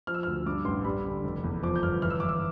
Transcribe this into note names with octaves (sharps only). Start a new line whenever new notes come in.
F3 F6
E6
D2 F6
G2 D6
A1 C6
G3 B5
D3
F1
E2
F3 D6
G6
G1 F6
E3 F6
E6
E3 D6
E6